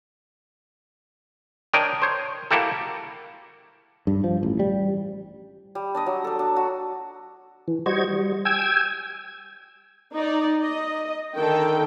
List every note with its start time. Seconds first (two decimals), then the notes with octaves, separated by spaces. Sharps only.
1.73 D4 A#4 C#5 D#5 G5
2.02 C5 C#5
2.51 A#3 E4 F#4 G4 A4
4.07 G2
4.24 F3
4.43 A1
4.60 G3
5.75 G3
5.95 D4 D5 D#5
6.06 F#3
6.24 D4 A4
6.39 D4
6.56 F#4
7.68 E3
7.86 G3 F#4 C5 D#5 C#6 G#6
8.08 G3
8.45 G5 G#5 E6 G#6
10.14 D#4 D5
10.60 D#5
11.35 D3 D#3 A4 G5